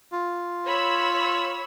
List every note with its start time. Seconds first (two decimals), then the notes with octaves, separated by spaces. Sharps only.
0.13 F4
0.67 C#5 B5 E6